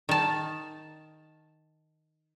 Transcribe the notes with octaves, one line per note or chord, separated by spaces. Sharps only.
D#3 A5